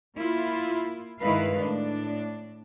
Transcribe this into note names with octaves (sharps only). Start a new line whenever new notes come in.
A#3 E4 F4
G2 D#3 G#3 E4 B4 F5
A2 D4